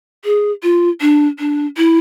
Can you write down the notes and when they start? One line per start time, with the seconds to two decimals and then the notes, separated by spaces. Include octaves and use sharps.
0.25 G#4
0.63 F4
1.01 D4
1.39 D4
1.77 E4